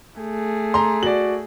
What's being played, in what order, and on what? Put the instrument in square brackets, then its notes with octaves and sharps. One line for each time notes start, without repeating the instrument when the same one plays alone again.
[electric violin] A3 G#4
[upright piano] A#5 C6
[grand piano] F#4 D5 [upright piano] F#7